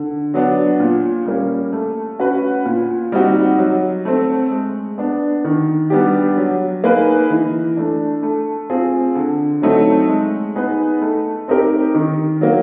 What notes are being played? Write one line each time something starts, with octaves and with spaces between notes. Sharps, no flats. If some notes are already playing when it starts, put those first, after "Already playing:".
Already playing: D3
F#3 B3 D4
A#2
G3 A#3 C#4
A3
C#4 F#4 B4
A#2
G3 C4 D#4 F#4
F#3
A3 C4
G#3
B3 D4
D#3
G3 B3 D4 G4
F#3
A#3 D#4 G#4 B4
E3
A3 D4
A3
C4 F4 G#4
D3
F#3 A3 C4 D#4
G#3
B3 D#4 G#4 B4
A3
C4 D#4 G4 A#4
D#3
F#3 A#3